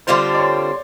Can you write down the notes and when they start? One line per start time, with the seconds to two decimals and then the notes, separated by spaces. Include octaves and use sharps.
0.07 D3 G3 C4 F4 C5
0.35 D5
0.39 C#5